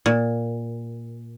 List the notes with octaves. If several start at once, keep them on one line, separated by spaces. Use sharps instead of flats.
A#2